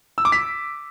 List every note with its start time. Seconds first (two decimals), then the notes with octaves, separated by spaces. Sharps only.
0.18 E6
0.25 D6
0.32 B6